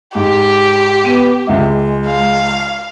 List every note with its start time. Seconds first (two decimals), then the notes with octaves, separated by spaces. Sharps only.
0.15 G#2 G4
1.05 B3 D#7
1.47 C#2 G#3 E5
2.07 F5